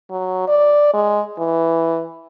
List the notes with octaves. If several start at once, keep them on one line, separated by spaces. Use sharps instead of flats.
F#3
D5
G#3
E3